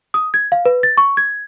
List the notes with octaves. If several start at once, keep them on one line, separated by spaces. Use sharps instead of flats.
D#6
G#6
F5
B4
A6
C#6
G#6